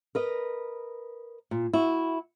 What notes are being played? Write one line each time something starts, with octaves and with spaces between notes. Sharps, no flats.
A#4 B4 D#5
A#2
E4 F#4